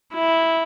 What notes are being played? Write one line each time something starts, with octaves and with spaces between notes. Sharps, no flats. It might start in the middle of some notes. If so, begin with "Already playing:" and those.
E4